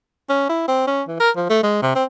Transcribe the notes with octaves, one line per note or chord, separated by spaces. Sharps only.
C#4
E4
C4
C#4
E3
A#4
F3
A3
G#3
C3
C4